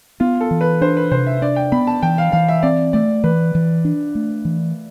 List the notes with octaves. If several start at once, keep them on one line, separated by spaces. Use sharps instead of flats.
B3 F4
A4
E3
B4
D4 C5
B4
C3 C5
E5
D4 D5
G5
B3 B5
A5
E3 G5
F5
E3 F5
E5
C4 D5
A3 D5
E3 B4
E3
D4
A3
E3